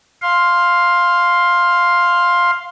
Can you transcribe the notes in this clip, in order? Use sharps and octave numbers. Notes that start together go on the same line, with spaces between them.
F5 C6